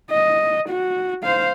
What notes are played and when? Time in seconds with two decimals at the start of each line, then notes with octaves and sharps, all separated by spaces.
0.11 D#5
0.70 F#4
1.23 C5 F5